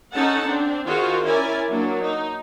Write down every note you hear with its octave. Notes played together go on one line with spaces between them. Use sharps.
C#4 D#4 A4 F#5 A5
C4 D4
D#3 F4 F#4 G#4 C5
C#4 E4 A#4 D5 G#5
F#3 A#3 D4
D#4